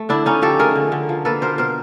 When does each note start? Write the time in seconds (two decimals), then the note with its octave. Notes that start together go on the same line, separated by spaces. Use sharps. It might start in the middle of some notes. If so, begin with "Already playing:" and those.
Already playing: A3
0.09 D3 D4 E4
0.26 D3 C#4 D#4
0.42 F3 G4 A4
0.59 A3 G#4 A#4
0.76 D3
0.92 D3
1.09 F3
1.25 A#3 A4 B4
1.41 B2 A#4 C5
1.58 B2 A#4 C5